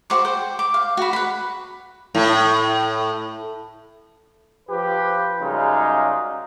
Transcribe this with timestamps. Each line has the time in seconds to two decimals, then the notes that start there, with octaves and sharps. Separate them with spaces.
0.10 F#4 C5 C#6 D6
0.25 C5 G5
0.59 D6
0.74 F5
0.97 F#4 B5
1.13 B4 B5
2.15 A2
4.69 F3 G4 B4
5.41 F#2 C#3 G3 G#3 D#4 F4